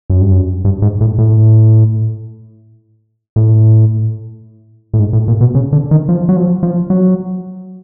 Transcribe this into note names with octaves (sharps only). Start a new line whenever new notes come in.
F#2
G2
F#2
G2
G#2
A2
A2
A2
A2
G#2
A2
A#2
B2
C#3
D3
D#3
F3
F#3
F3
F3
F#3